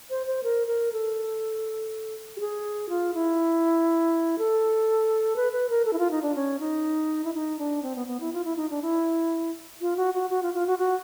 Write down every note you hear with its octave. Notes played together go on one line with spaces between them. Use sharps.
C5
C5
A#4
A#4
A4
G4
G#4
F4
E4
A4
B4
B4
A#4
A4
E4
F4
D#4
D4
C#4
D#4
E4
D#4
D4
C4
B3
B3
E4
F4
E4
D#4
D4
E4
F4
F#4
F#4
F#4
F4
F4
F#4
F#4